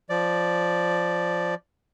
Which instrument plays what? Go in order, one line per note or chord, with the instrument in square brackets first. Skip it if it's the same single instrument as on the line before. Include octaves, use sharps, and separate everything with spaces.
[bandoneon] F3 D5